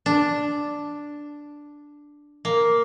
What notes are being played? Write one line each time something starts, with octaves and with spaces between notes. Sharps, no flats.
D4
A#3